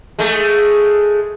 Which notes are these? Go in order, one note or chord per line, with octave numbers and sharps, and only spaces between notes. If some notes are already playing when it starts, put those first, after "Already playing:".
G#3 A3